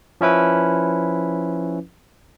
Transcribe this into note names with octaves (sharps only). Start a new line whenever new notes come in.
F3 C#4 E4 B4